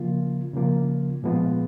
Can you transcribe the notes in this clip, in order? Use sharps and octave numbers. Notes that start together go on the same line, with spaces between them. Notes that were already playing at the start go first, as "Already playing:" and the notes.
Already playing: C#3 F3 A#3 F4
C#3 F3 A#3 F4
A#2 F3 G#3 B3 F4